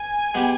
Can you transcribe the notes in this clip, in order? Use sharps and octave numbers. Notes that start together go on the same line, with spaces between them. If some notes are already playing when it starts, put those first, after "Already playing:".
Already playing: G#5
G#3 B3 G4